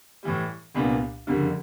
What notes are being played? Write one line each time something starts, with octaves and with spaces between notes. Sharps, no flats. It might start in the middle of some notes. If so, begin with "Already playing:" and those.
A2 E3 G3
C2 A#2 G3 B3 D4
F#1 F2 D3 G3